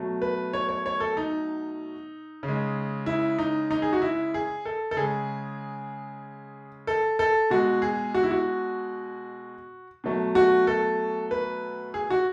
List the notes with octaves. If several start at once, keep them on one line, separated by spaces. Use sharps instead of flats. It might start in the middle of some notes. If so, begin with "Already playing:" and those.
Already playing: B2 F#3 A3
B4
C#5
C#5
C#5
A4
D#4
C#3
G#3
E4
D#4
D#4
G#4
F#4
E4
G#4
A4
A4
C#3 G#3 G#4
A4
A4
B2 G#3 F#4
G#4
F#4
E4
F#4
B2 F#3 A3
F#4
A4
B4
G#4
F#4